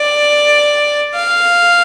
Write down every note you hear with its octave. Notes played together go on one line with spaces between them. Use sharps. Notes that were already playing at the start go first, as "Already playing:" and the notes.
Already playing: D5
F5